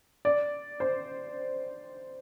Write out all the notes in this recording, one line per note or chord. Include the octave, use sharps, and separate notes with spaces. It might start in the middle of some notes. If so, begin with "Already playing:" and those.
D5
C5